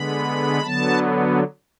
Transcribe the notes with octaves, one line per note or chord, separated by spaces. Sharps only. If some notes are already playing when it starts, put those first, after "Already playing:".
Already playing: D3 G#3 B3 B5
D3 F#3 B3 A5